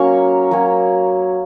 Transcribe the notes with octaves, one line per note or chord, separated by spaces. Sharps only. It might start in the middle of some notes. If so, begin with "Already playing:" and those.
Already playing: F#3 A#3 C#4 C#5 C#6
F#3 A#3 C#4